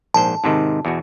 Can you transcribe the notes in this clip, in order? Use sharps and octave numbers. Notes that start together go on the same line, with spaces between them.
A#1 G#2 C5 A5
G#2 C3 D#3
E2 B2 F#4